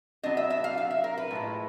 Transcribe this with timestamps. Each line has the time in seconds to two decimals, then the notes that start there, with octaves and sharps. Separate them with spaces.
0.23 F#3 B3 D4 D#5
0.37 E5
0.50 E5
0.64 F5
0.78 F5
0.91 E5
1.04 A#4
1.18 B4
1.31 A2 F3 G#3